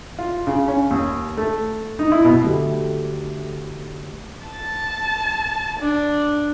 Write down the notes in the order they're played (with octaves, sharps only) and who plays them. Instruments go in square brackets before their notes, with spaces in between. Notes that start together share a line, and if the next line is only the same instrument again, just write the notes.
[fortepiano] F4
C#3
C#4
D#2
A3
D#4
E4
B2
[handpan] D3 A3 F#4 G4
[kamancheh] A5
D4